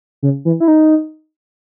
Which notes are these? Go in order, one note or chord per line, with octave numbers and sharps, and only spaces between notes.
C#3
E3
E4
D#4